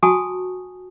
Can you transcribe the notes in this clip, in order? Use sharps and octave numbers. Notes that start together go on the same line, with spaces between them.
F#4 G#5 A5 C#6 D#6